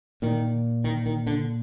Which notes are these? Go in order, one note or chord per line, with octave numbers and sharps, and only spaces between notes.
A#2 D#3
D#3
D#3
D3